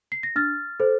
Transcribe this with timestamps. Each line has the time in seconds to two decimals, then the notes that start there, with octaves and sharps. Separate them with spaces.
0.12 C7
0.23 A#6
0.36 D4 F6 A6
0.80 A4 C5